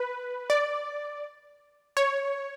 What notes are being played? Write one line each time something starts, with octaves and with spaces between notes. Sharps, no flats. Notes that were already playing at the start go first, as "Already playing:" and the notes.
Already playing: B4
D5
C#5